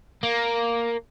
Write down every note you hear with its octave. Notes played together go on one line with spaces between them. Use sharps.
A#3